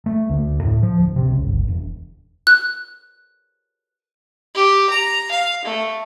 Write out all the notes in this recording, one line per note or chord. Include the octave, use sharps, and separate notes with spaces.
A3
D2
A2
F3
D1
C3
C#2
G1
E1
F#6
G4
A#5
F5
A3